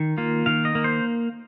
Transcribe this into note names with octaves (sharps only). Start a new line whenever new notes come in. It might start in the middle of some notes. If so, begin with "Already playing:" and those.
Already playing: D#3
A#3 F4
D#3 F5
D#5
A#3
C5